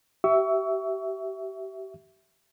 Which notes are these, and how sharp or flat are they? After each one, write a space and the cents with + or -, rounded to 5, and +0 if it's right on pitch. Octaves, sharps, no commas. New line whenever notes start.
G4 -35 E5 +0 C#6 +30